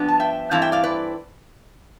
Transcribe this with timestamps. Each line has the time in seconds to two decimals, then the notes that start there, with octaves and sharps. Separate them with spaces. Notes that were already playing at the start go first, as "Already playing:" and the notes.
Already playing: G2 F3 B3 D4
0.08 A5
0.20 E5 G5
0.51 G2 E3 A3 C4 E4 F5 A5
0.62 E5 G5
0.72 D5 F5
0.83 B4 D5